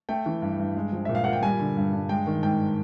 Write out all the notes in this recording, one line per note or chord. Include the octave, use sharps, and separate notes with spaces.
A3 G5
E3
G2
G2
G#3
F3
A#2 E5
F5
A#2 F#5
G5
G3 G#5
D3
G2
G2
G#3 G5
D#3
G#2 G5